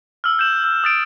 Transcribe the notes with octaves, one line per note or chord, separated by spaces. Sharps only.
E6 F6
G6 E7
E6
D#6 A6 D7